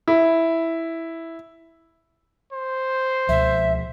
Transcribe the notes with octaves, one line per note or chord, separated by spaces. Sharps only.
E4
C5
C#2 B2 F3 E5